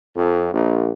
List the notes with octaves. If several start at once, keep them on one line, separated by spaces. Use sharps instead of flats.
F2
A#1